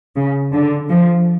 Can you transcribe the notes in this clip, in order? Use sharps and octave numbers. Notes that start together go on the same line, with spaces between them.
C#3
D3
F3